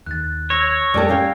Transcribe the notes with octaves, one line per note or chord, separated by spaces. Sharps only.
D#2 F#6 A6
C#5 E6 A#6
F2 G3 A3 G4 A4
G3 C#4 F5 G5